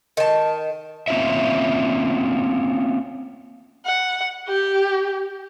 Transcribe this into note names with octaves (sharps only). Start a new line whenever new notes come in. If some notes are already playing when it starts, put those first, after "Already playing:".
D#3 A5
A#3 C4 C#4 F4 E5
F#5
G4